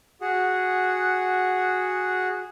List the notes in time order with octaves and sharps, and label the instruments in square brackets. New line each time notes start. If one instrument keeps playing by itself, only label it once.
[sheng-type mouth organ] F#4 G#4 F#5